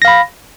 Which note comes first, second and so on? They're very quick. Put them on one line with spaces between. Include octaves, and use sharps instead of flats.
A#6 F5 B5